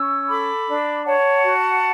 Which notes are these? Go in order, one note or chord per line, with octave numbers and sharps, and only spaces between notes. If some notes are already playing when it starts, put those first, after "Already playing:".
Already playing: C#4 C#6 E6
A4 B5 D6
D4
C#5 F#5 A5
F#4